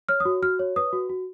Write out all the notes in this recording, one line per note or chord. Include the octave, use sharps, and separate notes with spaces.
C#5 F6
D#6
F#4
F#4 F6
C#5
B4 D#6
F#4
F#4